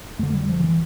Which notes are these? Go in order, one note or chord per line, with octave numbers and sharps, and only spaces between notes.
F2 D3 A3
G3
F3
D3
E3